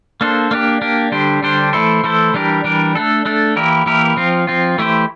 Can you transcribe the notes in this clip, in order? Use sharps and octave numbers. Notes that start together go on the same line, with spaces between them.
A#3 D4 A4 C5
A#3 D4 G4
A#3 D4 G4
D3 G3 D4 G4 C5
D3 G3 D4 G4 C5
E3 A3 E4 A4 C5
E3 A3 E4 A4 C5
E3 G3 D4 G4 A#4
E3 G3 D4 G4 A#4
A3 D4 A4
A3 D4 A4
E3 A#3 E4 G4 A#4
E3 A#3 E4 G4 A#4
F3 C4 F4
F3 C4 F4
E3 A3 E4 G4 C5